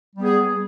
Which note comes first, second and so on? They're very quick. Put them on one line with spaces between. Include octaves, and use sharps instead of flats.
G3 B3 G#4